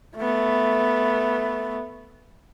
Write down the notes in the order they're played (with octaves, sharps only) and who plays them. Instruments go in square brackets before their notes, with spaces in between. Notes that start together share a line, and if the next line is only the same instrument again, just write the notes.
[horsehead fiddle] A3 B3